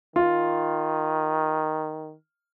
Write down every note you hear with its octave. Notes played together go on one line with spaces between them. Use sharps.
D#3 F4